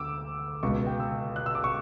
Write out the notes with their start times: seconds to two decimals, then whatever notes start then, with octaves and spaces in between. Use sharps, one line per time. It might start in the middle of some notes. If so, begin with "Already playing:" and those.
Already playing: D2 D3 D6 E6
0.63 C#2 B2 C#6
0.87 G5
1.00 E6
1.36 F#6
1.46 E6
1.55 D6
1.64 C#6